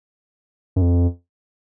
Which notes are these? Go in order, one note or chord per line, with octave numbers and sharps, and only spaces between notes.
F#2
F2